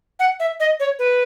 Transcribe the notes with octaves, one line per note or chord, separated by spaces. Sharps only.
F#5
E5
D#5
C#5
B4